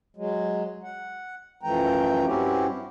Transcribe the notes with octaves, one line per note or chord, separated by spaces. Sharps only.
F#3 G#3
F#5
F#2 E3 F3 A3 G5 A#5
G2 C4 C#4 E4 F#4 G4